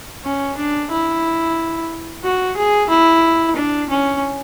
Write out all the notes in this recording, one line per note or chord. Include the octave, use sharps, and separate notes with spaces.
C#4
D4
E4
F#4
G#4
E4
D4
C#4